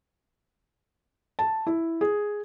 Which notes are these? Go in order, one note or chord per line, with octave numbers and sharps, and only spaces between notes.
A5
E4
G#4